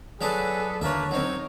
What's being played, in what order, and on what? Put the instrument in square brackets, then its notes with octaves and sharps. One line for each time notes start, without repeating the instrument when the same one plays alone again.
[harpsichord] F#3 D4 A5 [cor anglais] G#4 [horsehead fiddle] A4 B4
[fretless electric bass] D#2 D3 [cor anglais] A#3 [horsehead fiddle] B4 A5 [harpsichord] C#5 E5
[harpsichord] F#3 C4 [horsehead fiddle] D#4 A#4 [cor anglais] C#5